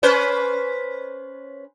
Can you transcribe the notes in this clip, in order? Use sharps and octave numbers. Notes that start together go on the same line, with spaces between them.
C#4 B4 C5